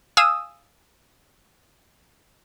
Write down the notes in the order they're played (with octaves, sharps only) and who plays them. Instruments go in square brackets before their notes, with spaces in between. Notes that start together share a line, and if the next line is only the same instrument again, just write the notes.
[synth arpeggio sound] F5 G#5 D#6 E6